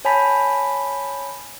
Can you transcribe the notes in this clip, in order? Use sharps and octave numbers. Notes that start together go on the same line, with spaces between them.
C#5 G#5 A5 B5 B6